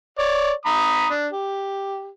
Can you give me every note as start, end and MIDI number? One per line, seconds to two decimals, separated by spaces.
0.19 0.51 73
0.19 0.51 74
0.66 1.09 82
0.66 1.09 83
0.66 1.09 87
1.10 1.27 62
1.32 2.07 67